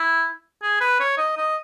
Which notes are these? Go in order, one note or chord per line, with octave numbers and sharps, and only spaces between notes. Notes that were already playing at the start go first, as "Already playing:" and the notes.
Already playing: E4
G#4
B4
C#5
D#5
D#5